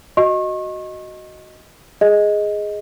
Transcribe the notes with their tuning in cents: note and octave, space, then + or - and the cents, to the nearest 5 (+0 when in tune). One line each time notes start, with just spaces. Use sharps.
F#4 +0 D#5 +0 C#6 -35
G#4 +0 D#5 +5